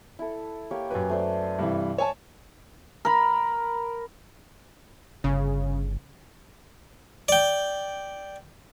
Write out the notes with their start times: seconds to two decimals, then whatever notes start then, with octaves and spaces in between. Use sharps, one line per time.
0.19 E4 A4
0.71 A#3 G4 C#5
0.90 F#2 B4 G#5 A#5 D6
1.09 A3 C5 D5
1.59 G2 C3 E3
1.98 C#5 G#5 A5
3.05 A#4 B5
5.24 G1 C#3
7.28 D5 G5